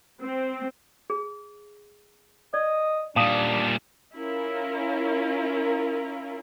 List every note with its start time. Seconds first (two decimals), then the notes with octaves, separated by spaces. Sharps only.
0.22 C4
1.10 G#4
2.54 D5 D#5
3.16 A#2 G3 D4 F5 A5 D#6
4.15 C#4 E4 F4 A#4